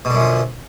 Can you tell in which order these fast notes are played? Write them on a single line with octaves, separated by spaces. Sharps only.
B2 D3 F#2 F3